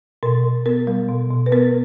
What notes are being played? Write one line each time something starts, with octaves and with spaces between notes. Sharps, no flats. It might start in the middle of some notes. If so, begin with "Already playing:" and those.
B2 A#4
B2
B3 A#4
G3
B2
B2
B4
B3 A#4